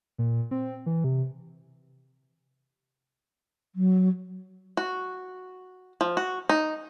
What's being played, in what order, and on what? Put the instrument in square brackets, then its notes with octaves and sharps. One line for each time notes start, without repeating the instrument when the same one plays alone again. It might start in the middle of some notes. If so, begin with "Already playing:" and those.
[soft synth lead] A#2
C4
E3
C3
[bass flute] F#3
[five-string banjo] F#4
F3
F#4
D#4